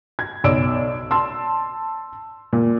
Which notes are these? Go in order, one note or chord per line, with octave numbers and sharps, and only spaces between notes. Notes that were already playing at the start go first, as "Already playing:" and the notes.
G#6
B1 C#5 D5 E6 D7
A5 C6 E6
A#2